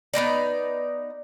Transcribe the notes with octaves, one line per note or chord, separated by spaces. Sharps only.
B3 C4 D#4 D5